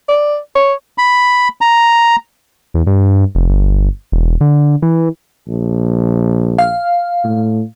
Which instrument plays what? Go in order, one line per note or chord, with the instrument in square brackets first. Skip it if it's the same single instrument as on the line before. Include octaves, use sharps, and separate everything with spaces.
[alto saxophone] D5
C#5
[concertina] B5
A#5
[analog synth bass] E2
G2
F1
G1
E1
D3
E3
[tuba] A#1
[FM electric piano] F5
[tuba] A2